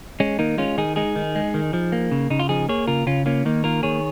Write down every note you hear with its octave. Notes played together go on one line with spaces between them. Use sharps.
G#3 C#4
D#3 A#3 D#4
G#3 C#4 F4
D#3 D#4 G#4
G#3 D#4 G#4
D#3
G#3
D#3
F3
A#3
C#3
C#3 D#4
F4
F3 D#4 G#4
A#3 G#4 C#5
C#3 F4 A#4
C#3 C#4 F4
A#3 C#4 F4
D#3 A#3 D#4
A#3 F4 A#4
D#3 G#4 C#5